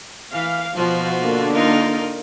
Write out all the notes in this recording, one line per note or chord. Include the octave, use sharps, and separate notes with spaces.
E3 F5
B2 F3 F4 F#4
D3 A#3 D4
D#4 F4 A#4